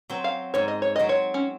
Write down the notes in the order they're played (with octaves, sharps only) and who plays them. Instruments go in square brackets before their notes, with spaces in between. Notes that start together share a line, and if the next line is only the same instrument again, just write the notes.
[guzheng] F#3 C4
[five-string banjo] F5
[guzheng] G#2 [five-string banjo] C#5
[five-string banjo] D#5
C#5
[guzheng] F#3 C4 [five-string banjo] D#5
[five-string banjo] C#5
C#4